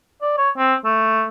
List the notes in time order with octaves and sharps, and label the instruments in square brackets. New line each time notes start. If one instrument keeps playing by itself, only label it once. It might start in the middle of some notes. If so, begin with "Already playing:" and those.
[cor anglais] D5
C#5
C4
A3